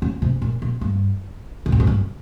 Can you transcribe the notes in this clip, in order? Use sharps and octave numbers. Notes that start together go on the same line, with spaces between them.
C#3
C3
A#2
A#2
G2
C3
A#2
G#2
G2